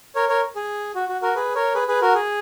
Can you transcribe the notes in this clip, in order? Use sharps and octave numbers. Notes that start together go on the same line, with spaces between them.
A#4 C#5
A#4 C#5
G#4
F#4
F#4
F#4 A#4
G#4 B4
A#4 C#5
G#4 B4
G#4 B4
F#4 A#4
G#4